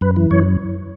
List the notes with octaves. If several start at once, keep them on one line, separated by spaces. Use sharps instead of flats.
F#2 B4
E3
F#2 C#5